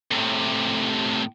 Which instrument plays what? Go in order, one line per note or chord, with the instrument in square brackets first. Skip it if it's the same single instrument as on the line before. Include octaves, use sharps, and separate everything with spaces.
[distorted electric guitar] A2 C3